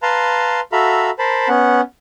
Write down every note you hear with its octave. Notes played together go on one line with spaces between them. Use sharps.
B4 F5 A5 A#5 C6
F#4 A4 E5 F5 A#5 B5
A#4 C5 A5 B5
B3 C#4 F#5